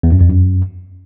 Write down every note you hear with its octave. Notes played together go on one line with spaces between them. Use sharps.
E2
F#2
F2
F#2